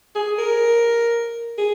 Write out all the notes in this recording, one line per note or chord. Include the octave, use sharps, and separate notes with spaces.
G#4
A#4
G#4